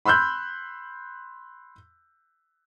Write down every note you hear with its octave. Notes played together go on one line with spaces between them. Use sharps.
B5 C6 E6 F#6 G6